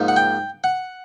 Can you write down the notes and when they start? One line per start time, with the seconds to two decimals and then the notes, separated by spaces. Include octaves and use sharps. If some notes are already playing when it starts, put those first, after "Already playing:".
Already playing: G#2 F3 A#3 D#4
0.08 F#5
0.16 G5
0.64 F#5